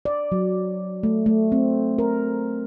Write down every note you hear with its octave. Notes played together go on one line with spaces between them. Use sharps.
D5
F#3
A3
A3
C4
A#4